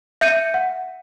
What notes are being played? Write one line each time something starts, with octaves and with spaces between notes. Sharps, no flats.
E5 G6 C#7 D#7
F#5